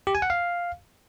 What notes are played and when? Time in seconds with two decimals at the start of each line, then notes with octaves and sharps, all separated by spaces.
0.07 G4
0.15 G#5
0.22 F#5
0.30 F5